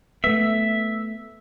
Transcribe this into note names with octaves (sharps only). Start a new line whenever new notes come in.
A3 B3 E5